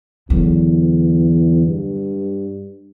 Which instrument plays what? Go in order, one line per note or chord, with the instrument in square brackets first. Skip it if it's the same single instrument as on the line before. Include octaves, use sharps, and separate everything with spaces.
[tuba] E2 [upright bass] D3 F#3
[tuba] G2